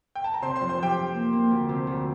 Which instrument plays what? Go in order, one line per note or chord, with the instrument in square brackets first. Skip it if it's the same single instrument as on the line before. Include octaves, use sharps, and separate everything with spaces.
[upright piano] G5
A5
A#5
[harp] C3 [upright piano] C5 C6
[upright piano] C5 C6
[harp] F2
[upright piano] C5 C6
[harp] F3 [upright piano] G4 G5
[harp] F2
A#3
A#3
D2
C3
D2